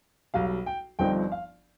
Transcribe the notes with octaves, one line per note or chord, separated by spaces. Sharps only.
B1 B2 G3 F5
G5
G1 G2 F3 C4 D#4 G5
F5